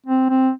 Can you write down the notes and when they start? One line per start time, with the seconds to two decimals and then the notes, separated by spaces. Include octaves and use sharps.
0.07 C4
0.30 C4